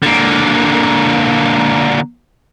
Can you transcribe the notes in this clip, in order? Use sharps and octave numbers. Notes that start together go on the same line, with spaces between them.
D3 A#3